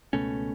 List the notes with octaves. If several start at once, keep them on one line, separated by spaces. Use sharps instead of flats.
C#2 B2 A3 C#4